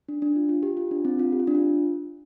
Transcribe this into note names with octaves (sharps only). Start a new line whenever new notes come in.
D4
D4
F4
F4
G4
F4
D4
C4
F4
G4
F4
D4
F4